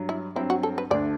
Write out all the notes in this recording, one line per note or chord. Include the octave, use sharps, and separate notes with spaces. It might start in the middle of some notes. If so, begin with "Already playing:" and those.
Already playing: G2 F#3
E4
G2 F#3 C4 E4
F#4
A4
B4
D2 D3 A3 D4 D5